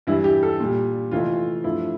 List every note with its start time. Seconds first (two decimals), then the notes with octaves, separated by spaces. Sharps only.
0.07 G2 E3 G3 E4
0.24 G4
0.43 A4
0.60 A#2 G3
1.11 F2 C3 E3 A3 F4
1.64 G2 F3 A3 E4